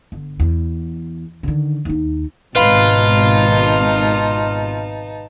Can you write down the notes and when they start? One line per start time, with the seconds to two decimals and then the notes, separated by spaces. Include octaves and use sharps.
0.12 G1
0.40 E2
1.43 D3 D#3
1.85 D#2 D#4
2.55 G#1 B2 D#4 F4 B4 F5 A5 B5